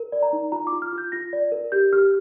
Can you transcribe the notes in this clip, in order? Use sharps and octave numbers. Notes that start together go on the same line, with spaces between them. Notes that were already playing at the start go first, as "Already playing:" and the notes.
Already playing: A#4
D5
A#5
D#4
F4 A#5
D6
F4
F6
F4
G6
F4 A#6
D5
A#4
G4 G6
G4 F6